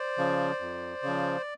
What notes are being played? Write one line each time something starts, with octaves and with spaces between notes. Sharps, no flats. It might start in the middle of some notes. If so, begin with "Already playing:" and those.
Already playing: C5 D5
C#3 F3
F2
C#3 F3